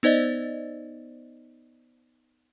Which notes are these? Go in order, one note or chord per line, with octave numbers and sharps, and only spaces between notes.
B3 D#4 C5 D5 D#5 A6